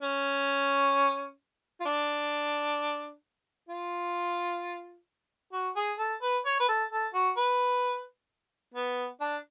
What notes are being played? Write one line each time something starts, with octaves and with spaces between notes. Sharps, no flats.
C#4
F4
D4
F4
F#4
G#4
A4
B4
C#5
B4
A4
A4
F#4
B4
B3
D4